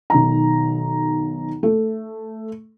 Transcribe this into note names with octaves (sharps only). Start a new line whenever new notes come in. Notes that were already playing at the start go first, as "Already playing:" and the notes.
B1 D#3 A#5
A3